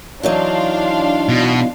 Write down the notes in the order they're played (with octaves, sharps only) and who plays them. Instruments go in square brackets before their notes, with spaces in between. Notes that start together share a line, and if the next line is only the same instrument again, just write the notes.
[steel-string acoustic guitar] E3 F#3 D#4 [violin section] D4 F5 C6
[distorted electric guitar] B2